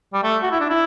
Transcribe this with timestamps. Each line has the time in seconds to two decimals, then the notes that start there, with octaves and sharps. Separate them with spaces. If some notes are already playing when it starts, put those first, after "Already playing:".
0.14 G3
0.23 A3
0.43 F#4
0.51 E4
0.61 D4
0.70 E4